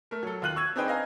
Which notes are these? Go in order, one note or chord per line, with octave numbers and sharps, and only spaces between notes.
A3 A#4
F#3 A4
D#2 F4 F#6 D#7 F#7
C#6 E6 G#6
C4 D4 D#4 G#4 B4 G5
D#5 F5 G#5 A#5